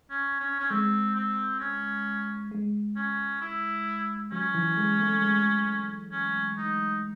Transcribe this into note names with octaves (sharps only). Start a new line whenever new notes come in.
C#4
C#4
C#4
G#3 C4
C4
C#4
G#3
C#4
E4
F#3 C#4
E3
G#3
A3
G#3
C#4
D#4